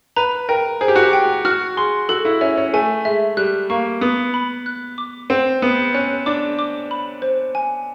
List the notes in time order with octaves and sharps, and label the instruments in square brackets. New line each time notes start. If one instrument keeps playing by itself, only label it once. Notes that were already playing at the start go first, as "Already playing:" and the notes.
[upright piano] B4 [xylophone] A#5
[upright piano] A#4 [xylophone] G5
[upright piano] G#4 [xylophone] C5
[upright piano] G4
F#4
G4
[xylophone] G5
[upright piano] F#4 [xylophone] F6
[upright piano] G#4 [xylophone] C6
[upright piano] F#4 [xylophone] A4
[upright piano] E4
[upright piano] C#4 [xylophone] E5
[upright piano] C#4
[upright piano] A3 [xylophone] G#5
[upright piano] G#3 [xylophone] E5
[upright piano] G3 [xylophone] F#6
[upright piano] A#3 [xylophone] C#6
[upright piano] B3 [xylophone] D#6
[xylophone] B5
F#6
D6
[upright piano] C4 [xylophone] F#5
[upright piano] B3 [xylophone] D#6
[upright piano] C#4 [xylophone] F#6
[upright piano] D4 [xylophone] D6
[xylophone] D6
B5
C5
G#5